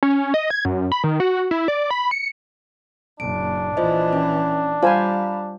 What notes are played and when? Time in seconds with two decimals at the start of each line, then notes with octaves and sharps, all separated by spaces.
0.03 C#4
0.34 D#5
0.50 G#6
0.65 F#2
0.92 B5
1.04 D#3
1.20 F#4
1.51 E4
1.68 D5
1.90 B5
2.11 C#7
3.20 F#1 A#2 D4 D7
3.77 A#1 E3 F4 C5 D#5
4.13 C#4
4.83 G3 F4 C5 F5 G#5 A#5 B5